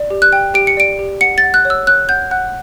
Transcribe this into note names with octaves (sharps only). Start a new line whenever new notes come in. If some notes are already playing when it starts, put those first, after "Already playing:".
Already playing: D5
G4
F#6
G5
G4 D7
C#7
D5 D7
G4
F#5 C#7
A6
F#5
F#6
C#5
E6
C#5 F#6
F#5 G6
F#5 F#6